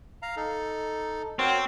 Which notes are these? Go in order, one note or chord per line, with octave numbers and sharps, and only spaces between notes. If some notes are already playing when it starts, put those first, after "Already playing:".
F5 A#5
D#4 A4
C4 F#4 A#4 C#5